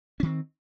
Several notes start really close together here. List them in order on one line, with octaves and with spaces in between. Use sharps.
C#4 D#3 C4